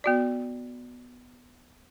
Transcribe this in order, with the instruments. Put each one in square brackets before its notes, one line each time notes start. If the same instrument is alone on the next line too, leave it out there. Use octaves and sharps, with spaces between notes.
[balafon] B3 F#4 D5